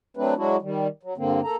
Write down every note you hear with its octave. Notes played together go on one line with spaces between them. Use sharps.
F#3 A3 C4 D4 B4
F#3 G#3 D4 E4 F#4
D#3 G3
F#3
G2 D3 A#3 C4
A#3 A4 A#5